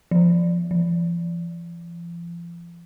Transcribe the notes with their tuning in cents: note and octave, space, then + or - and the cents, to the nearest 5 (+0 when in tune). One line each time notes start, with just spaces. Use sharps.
F3 -15
F3 -40